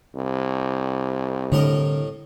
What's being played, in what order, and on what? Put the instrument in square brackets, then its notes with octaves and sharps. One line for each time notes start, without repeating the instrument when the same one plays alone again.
[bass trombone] C2
[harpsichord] A2 A#4 D#5 [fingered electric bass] D3